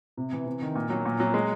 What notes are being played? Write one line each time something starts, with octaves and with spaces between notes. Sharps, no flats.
C3
E3
C3
D#3
A#2
F#3
A#2
F#3
G#3